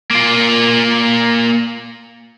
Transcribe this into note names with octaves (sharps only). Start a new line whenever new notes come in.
A#3 F4